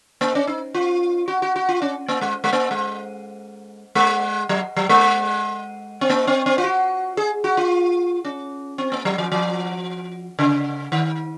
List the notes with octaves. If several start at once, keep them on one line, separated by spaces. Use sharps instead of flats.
A#3
C#4
D#4
F4
F#4
F#4
F#4
F4
C#4
A#3
G#3
G#3
A#3
G#3
G#3
F#3
F#3
G#3
C4
A#3
C4
C4
F4
F#4
G#4
F#4
F4
C#4
C4
A#3
F#3
F3
F3
C#3
D#3